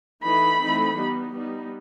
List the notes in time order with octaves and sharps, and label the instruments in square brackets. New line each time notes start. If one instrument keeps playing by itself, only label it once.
[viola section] E3 A3 D#4 B5
E3 A3 C4 D#4
G3 B3 D#4
G3 B3 D#4